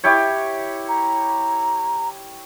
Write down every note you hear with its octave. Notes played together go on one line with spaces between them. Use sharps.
E4 G4 C#5
A#5